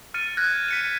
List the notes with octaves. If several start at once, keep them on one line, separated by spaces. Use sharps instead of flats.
F6 A6 C#7 D#7
F6 F#6 G#6 A#6
B6 C#7 D#7